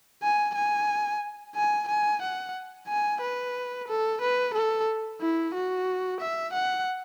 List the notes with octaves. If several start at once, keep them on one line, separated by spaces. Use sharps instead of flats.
G#5
G#5
G#5
G#5
F#5
G#5
B4
A4
B4
A4
E4
F#4
E5
F#5